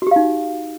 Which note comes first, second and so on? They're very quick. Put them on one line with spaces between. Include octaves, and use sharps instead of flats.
F#4 G4 F5 D#4